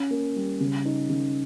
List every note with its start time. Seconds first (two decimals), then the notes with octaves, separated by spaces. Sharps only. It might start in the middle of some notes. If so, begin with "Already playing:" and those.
Already playing: C#4
0.11 A#3
0.36 G3
0.60 C#3
0.85 D#4
1.09 C#3